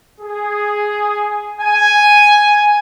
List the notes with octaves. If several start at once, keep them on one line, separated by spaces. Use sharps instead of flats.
G#4
G#5